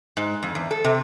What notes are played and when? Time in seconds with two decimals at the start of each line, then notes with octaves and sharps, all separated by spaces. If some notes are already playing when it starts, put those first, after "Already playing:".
0.17 G#2
0.43 F2
0.55 E2
0.71 A4
0.84 C3